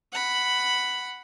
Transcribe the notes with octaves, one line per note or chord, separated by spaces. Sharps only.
F#5 B5